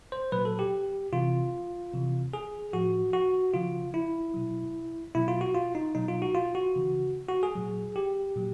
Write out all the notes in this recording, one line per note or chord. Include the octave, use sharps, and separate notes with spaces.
C5
A#2 F#3 B4
A4
G4
C3 E3 F4
C3 E3
G#4
A2 F3 F#4
F#4
C#3 F3 F4
E4
B2 F#3
B2 F#3 E4
F4
F#4
F4
D#4
B2 F#3 D#4
F4
F#4
F4
F#4
C#3 E3
F#4
G#4
A#2 F#3
G4
A#2 F#3